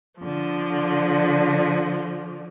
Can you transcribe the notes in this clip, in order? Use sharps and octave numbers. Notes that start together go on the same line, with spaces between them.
D3 F3